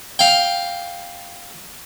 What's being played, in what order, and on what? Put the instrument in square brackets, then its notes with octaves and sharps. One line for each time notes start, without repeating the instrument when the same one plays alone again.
[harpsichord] F5 G5